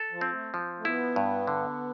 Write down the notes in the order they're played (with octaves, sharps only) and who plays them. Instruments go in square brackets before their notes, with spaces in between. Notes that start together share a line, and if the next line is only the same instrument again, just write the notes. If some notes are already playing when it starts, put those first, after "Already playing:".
Already playing: [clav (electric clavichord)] A4
[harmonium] F3
[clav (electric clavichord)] C4
[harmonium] A3
[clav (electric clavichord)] F3
[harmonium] A3
[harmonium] B3 [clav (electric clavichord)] E4
[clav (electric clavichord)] G2
D3